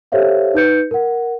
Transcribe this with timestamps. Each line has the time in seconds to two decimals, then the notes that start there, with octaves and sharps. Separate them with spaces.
0.12 G4 A4 C5 C#5 E5 F5
0.54 D#4 B4 G6 C#7
0.91 A#4 F#5